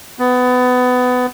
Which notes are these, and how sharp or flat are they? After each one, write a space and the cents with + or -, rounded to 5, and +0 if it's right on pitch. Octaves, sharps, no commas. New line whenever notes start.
B3 +20